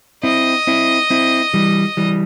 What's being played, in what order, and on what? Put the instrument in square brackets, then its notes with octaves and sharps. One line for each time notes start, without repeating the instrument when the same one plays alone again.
[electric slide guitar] C4 E4 [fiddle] D#5
[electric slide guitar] C4 E4
C4 E4
E3 G3
E3 G3